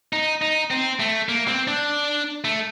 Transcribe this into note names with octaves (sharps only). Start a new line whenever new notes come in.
D#4
D#4
C4
A3
A#3
C4
D4
A3